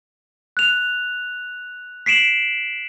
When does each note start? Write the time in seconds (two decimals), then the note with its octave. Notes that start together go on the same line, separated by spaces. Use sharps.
0.57 F#6 F7
2.06 B6 C7 D7 E7 F#7